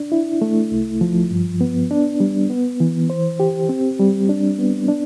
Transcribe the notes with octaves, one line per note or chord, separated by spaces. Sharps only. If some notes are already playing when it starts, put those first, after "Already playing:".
Already playing: D4
E4
A3
C2
F3
G2
B3
D4
G3
B3
E3
C5
G4
C4
G3
D4
B3
D4